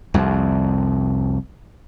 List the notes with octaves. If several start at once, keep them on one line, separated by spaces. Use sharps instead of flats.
C2 F2